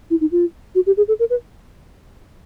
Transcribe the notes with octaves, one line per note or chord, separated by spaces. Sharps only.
E4
D#4
F4
F#4
G4
G#4
A4
A#4
B4